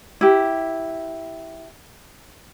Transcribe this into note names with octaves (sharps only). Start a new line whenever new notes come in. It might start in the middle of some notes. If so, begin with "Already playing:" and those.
E4 G4